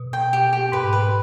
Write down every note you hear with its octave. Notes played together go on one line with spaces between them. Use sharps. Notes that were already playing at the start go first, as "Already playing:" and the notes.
Already playing: B2
G5
G4
G4
G#2 B4
B4